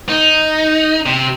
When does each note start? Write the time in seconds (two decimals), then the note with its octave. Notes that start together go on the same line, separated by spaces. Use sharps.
0.09 D#4
1.06 C3